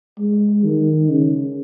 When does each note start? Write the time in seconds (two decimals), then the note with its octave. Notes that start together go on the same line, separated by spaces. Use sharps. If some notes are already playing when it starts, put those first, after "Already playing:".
0.18 G#3
0.65 D#3
1.10 C#3